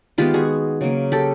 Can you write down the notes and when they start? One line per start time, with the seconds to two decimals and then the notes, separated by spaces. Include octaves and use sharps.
0.18 D#3 G#3 B3 F4 G4
0.34 F#4 G#4
0.81 C#3 F#3 A#3
1.12 G4 A4